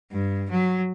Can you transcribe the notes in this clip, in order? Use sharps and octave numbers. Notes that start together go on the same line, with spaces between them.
G2
F#3